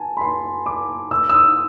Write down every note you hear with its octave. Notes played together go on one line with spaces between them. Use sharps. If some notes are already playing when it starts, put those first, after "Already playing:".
Already playing: G#5 A5
B5
C6
D6
E6
E6
D#6